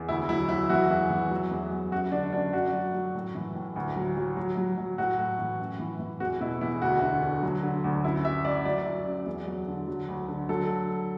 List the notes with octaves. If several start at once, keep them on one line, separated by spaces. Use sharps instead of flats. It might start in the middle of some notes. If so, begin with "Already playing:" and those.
Already playing: E2
D2 E4
F#3 E4
F#3 E4
E3 F#4
E2
E3
F#3
E2
F#3
F#2 F#4
D3 D4
F#2 D4
F#2 F#4
F#3
F#3
A2
E3
A2
D2
F#3
F#3
F#3
F#3
F#3
A2 F#4
A2
E3
F#2
E3
E3
E2 F#4
B2 E4
E2 E4
D2 F#4
D3
D3
F#3
D3
D2
F#2 E4
F#2 E5
F#2 D5
F#3 D5
F#3
F#2
E2
F#3
D3
F#3
D2
D3
F#3 A4